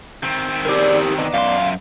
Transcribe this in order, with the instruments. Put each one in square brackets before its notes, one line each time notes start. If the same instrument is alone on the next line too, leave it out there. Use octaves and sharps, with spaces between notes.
[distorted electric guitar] D#3 C4
[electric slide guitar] G4 A#4 [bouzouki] G#4 D5
[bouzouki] B3 D4 D#4
[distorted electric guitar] F#2 C6 [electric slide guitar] F5